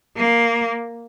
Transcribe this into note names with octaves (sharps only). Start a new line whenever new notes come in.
A#3